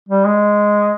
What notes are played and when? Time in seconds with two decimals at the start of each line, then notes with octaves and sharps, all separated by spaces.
0.09 G3
0.25 G#3